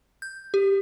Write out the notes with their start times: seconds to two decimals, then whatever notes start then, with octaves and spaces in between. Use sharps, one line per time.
0.22 G6
0.54 G4